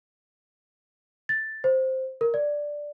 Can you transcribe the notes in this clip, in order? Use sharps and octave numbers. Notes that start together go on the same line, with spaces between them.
A6
C5
A#4
D5